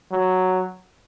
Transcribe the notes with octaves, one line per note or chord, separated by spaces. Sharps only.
F#3